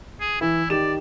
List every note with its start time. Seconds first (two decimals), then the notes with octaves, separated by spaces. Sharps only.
0.20 G#4
0.41 E3 E4
0.70 D#3 G4 D5 E7